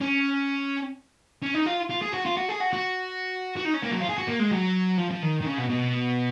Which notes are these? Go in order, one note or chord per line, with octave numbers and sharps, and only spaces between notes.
C#4
C#4
D#4
F4
F4
G#4
F#4
F4
F#4
G#4
F#4
F#4
F#4
D#4
C#4
A#3
F#3
F4
G#4
F#4
A#3
G#3
F#3
F3
F3
D#3
D#3
C#3
B2
B2